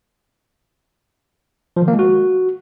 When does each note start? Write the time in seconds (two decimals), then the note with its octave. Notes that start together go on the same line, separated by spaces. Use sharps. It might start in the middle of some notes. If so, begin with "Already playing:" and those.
1.76 F3
1.82 D#3
1.88 A#3
1.93 G#3
1.99 F#4